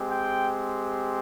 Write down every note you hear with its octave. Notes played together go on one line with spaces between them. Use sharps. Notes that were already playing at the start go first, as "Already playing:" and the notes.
Already playing: G#3 C4 G4
G5